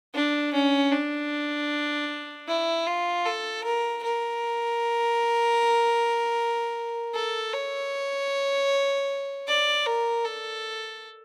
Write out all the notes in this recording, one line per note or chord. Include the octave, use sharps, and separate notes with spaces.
D4
C#4
D4
E4
F4
A4
A#4
A#4
A4
C#5
D5
A#4
A4